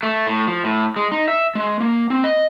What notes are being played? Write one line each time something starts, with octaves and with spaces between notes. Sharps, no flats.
A3
A2
F3
A2
G#3
D#4
E5
G#3
A#3
C4
D#5